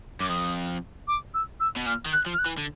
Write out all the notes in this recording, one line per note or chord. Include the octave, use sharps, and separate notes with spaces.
F#2 D6
F2 D#6
D6
E6
E6
B2
A#2 F6
D#3
F#6
F3
F6
F#6
E3
D3